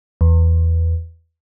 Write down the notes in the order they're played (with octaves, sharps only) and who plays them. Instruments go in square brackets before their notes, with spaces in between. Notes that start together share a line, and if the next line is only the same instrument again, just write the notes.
[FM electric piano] E2